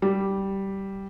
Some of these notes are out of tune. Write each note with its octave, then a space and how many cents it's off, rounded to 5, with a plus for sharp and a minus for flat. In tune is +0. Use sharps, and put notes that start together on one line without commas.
G3 -10